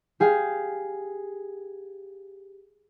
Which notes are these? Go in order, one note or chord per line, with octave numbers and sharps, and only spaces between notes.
G4 G#4 F5